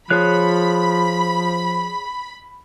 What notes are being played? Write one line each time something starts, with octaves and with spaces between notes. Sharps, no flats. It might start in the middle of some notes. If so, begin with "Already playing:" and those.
F3 G#4 C#5 B5 F#6